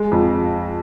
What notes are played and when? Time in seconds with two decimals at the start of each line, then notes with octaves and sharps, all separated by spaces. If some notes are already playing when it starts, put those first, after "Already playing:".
Already playing: G#3
0.11 F2